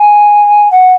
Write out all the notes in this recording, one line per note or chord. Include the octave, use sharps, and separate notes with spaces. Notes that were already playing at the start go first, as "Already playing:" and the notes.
Already playing: G#5
F#5